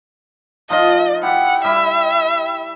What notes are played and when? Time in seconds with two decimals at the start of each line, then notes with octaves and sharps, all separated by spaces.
0.70 F3 D#4 F4 D#5
1.23 E4 G4 F#5
1.64 G3 E4 E5